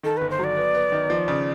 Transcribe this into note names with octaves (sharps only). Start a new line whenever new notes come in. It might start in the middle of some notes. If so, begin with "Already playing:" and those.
D#3 A4
G1 B4
C5
F#3 D5
B3
B3
D#3
F3
C#3